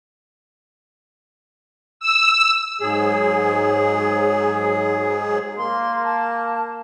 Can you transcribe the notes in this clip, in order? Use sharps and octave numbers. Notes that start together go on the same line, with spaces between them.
E6
G#2 F#3 G#4
A#3 C6
A5